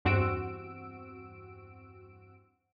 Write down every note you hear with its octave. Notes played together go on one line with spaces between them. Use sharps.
E2 G2 C4 F#4 E6 D7